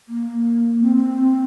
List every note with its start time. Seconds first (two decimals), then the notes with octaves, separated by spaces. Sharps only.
0.09 A#3
0.82 C4
0.97 C4